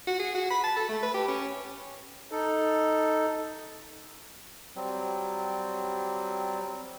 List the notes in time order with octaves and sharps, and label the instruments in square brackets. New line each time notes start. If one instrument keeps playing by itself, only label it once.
[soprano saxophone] F#4
G#4
F#4
B5
A5
A4
A3
B4
G4
C#4
[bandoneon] D#4 A4
F#3 G3 C4